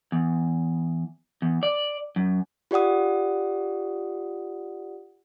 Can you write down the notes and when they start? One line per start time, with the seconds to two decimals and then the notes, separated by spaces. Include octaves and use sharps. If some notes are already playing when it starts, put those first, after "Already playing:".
0.12 E2
1.42 E2
1.63 D5
2.16 F#2
2.71 F4 G4 D5 F#5 D#6